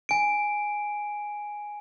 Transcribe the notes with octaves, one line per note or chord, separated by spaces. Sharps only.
G#5 D7